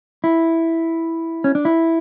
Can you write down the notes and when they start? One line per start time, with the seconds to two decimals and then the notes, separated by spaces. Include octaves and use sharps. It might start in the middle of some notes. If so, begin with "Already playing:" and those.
0.24 E4
1.44 C#4
1.55 D4
1.65 E4